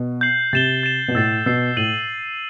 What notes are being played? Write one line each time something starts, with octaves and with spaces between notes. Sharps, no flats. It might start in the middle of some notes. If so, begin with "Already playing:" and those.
Already playing: B2
G6 C7 F#7
C3 A6 E7 G7
A6 E7 G7
B2
A2 E6 A6 C7
B2 E6 A6 C7
A2 G6 D#7 F#7